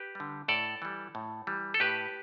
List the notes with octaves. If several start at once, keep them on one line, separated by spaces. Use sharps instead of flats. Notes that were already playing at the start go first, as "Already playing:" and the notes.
Already playing: G4 B4
D3 G3
A2 A4 D5
E3 G3
A2
E3 G3
A4
A2 G4 B4